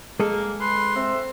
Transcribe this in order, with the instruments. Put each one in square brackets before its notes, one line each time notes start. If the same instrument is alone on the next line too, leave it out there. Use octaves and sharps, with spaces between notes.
[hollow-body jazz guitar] G#3 G#4 A4 [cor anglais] A#3
[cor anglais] B4 [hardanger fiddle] C6
[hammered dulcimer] C4 [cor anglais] E5